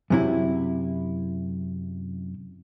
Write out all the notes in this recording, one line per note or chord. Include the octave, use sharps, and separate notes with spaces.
F#2 C3 E4